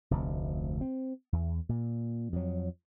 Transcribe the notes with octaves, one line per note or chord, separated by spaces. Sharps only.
F1 D2 C3
C4
E2
A#2
F2 F#3